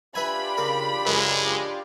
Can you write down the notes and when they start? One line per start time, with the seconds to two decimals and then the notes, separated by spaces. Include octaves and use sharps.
0.15 D4 F4 G4 B4 E5 G#5 B5
0.58 C#3 A#4
1.06 C#2 F#2 G#3